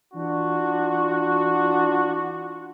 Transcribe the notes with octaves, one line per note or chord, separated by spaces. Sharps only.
E3 D4 F4 F#4